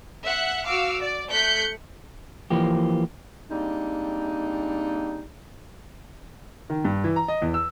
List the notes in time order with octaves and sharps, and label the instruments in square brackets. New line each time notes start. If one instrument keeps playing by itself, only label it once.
[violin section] E5 F#5 F#6
F#4 F5 D6 E6
D5
A3 F#6 G6 B6 C#7
[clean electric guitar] E3 F3 A#3 G4
[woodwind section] G3 G#3 A#3 C4 D4 D#4
[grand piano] D#3
G2
E3
A#5
D#5
E2
E6